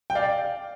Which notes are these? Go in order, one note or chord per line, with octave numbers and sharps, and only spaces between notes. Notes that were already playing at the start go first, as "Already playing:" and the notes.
G5
D5 F5